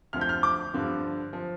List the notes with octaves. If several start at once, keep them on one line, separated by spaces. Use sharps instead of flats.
D2 D3 F3 F6
G6
F6
D6
G2 D3 F3
F3